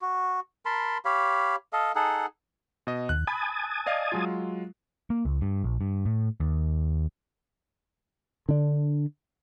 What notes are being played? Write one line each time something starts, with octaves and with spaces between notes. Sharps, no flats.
F#4
A#4 A5 B5 C6
G4 C#5 F5 B5
A4 D#5 F5
D#4 G#4 A4 F#5
B2 D#5
D#2 F#6
G#5 A5 B5 D#6
D5 D#5 F5
F#3 G#3 F4
A#3
C#2
G2
A#1
G2
A2
D#2
D3 D4